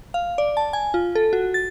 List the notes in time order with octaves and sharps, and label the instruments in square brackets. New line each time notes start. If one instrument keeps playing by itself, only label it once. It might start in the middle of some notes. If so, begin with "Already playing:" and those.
[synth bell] F5
D5
A5
G#5
F4
A4
F#4
A6